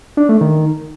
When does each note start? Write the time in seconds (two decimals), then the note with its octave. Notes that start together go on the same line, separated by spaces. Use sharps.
0.17 D4
0.29 A3
0.41 D#3